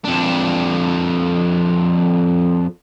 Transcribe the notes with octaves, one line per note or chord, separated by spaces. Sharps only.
F2 D4